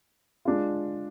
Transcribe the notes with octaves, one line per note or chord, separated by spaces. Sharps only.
G#3 D4 F4